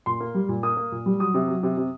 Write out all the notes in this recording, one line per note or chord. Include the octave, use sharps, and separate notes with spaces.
A#2 C6
A#3
G3
A#2
A#3 D#6
A#3
A#2
G3
F#3 D#6
C3
F#3
C3
C3